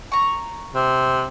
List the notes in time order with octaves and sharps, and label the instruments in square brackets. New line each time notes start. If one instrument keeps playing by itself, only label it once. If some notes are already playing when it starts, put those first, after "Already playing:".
[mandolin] A#5 C#6
[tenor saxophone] C3